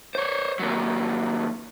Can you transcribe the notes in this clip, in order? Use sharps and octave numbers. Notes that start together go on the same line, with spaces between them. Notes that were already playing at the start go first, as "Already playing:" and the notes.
C5 C#5
D#2 F#3